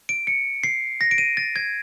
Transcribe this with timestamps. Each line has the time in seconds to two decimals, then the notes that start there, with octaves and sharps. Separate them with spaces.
0.09 D7
0.27 C#7
0.64 C7
1.01 A#6
1.11 D7
1.18 D#7
1.37 A6
1.56 G#6